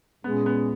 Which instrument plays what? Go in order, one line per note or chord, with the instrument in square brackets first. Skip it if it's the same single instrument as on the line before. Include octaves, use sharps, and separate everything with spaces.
[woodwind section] A#2 G#3 C#4 G#4 [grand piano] B3
[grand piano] B3